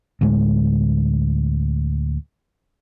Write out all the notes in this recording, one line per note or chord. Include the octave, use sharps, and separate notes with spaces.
D2 A2 G#3